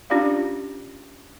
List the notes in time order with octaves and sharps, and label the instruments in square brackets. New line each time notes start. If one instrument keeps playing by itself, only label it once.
[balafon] C#4 D4 F4 G4 D5 F5